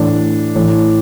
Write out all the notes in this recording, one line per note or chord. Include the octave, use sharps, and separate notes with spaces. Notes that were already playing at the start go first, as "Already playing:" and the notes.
Already playing: A2 E3 D4
A2 E3